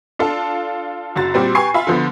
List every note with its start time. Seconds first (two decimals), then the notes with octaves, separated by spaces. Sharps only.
0.19 D4 F4 A4 F5
1.16 F#1 F#2 F#4 A6
1.34 A#2 G3 C4 F#4
1.55 G4 B4 G#5 C#6 C7
1.74 F4 E5 G#5 B5
1.87 D3 F3 B3